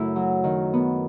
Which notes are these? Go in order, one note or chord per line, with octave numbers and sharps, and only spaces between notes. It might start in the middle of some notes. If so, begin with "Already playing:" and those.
Already playing: F#2 C#3 A3 E4
F#3
D#3
B3